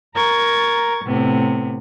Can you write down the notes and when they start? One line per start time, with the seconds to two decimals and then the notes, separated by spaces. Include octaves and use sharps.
0.16 A#4 A#5 C#6 G#6 A6
1.05 A2 C3 B3